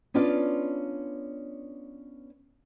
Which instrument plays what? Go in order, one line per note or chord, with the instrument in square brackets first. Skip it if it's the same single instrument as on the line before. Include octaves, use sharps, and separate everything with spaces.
[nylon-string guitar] B3 C#4 D4 F4 D5 F5